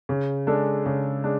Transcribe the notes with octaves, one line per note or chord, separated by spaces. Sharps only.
C#3
G#3 D4 A4
C#3
G#3 D4